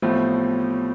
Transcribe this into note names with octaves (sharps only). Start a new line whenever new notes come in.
A1 A2 F3 A3 B3 C4